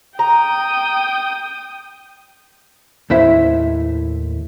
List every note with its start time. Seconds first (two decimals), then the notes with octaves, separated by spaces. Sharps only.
0.19 G5 A#5 D#6
3.10 D#2 A2 E4 C5 E5